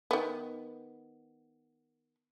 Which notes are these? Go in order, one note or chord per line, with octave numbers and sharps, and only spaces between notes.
D#3 B3